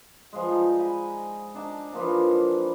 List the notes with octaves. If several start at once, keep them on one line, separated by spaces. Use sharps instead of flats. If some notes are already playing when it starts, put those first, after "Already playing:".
F3 G3 G#3
D#4
G#5 B5
D4 D#4 A5
E3 F3 A#3 D4